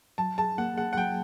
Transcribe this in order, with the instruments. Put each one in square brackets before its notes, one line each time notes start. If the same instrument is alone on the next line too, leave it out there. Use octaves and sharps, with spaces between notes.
[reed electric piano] F#3 [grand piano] A5
[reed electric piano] G#4 [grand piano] A5
[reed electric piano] A#3 [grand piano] F#5
[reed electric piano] G#4 [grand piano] F#5
[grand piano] F#5
[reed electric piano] F#3 [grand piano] G5